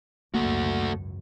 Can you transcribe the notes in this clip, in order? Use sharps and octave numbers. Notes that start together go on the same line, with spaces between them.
G#1 C#2 F#2 A3 A#3 F#4